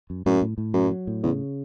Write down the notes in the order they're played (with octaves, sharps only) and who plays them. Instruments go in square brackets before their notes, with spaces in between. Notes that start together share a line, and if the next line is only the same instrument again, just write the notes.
[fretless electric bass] F#2
[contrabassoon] F#2 [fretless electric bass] A2
[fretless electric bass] A2
A2
[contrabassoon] F#2 [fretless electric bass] F#3
[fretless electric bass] F#3
A2
[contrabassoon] E2 [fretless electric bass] C#3